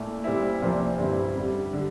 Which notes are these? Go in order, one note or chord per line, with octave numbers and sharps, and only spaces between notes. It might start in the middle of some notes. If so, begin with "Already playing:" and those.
Already playing: A#2 A3 E4
A#2 G3 C4 E4
C2 A#2 F3 C4
G2 D3 G3 C4 E4
F2 D3 G3
D3 G3